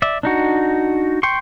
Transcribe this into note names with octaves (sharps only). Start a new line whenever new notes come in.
D5 E5
D4 D#4 F#4
G5 C6 C#6